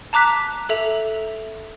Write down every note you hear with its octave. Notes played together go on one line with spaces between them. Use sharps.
A5 A#5 D6 F#6 B6
A4 E5 F7